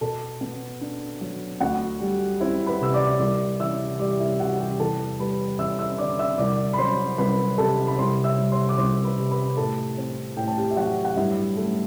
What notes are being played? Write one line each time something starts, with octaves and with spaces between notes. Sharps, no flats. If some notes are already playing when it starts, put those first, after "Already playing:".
B2 A4 A5
B3
D4
F#3
D2 F#4 F#5
G3
C4 E4 E5
B4 B5
C3 E6
D5 D6
C2 D5 D6
E3 E5 E6
G3 D5 D6
E4 E5
C3 F#4 F#5
G4 G5
E2 A4 A5
G3 B4 B5
E2 E5 E6
E5 E6
D3 D5 D6
E5 E6
C2 D5 D6
B5
F#3 C5 C6
C2 B4 B5
C3 A4 A5
B5
C2 C5 C6
E5 E6
G3
C5 C6
D6
C2 C5 C6
B4 B5
C3
B4 B5
A2 A4 A5
C4
A2 G5
A5
G4 G5
E5
F#3 F#4 F#5
F#5
G2 E4 E5
A3